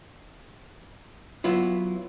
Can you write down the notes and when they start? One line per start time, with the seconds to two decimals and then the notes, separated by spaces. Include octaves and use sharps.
1.44 F#3 B3 E4 F4